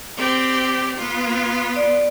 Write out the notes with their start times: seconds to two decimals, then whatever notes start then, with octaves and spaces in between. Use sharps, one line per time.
0.17 C4 G4 D5
0.98 B3 F4
1.76 D5